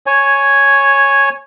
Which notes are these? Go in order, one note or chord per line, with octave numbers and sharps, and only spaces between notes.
C#5 G#5